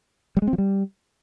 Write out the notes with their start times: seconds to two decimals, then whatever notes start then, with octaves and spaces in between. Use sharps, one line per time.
0.37 G3
0.42 G#3
0.47 C4
0.53 F3
0.58 G3